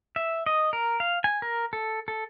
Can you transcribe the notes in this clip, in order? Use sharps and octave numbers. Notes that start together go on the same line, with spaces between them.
E5
D#5
A#4
F5
G#5
A#4
A4
A4